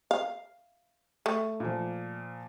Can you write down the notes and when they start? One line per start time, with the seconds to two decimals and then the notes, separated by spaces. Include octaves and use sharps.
0.11 F5
1.26 A3
1.60 A#2 F3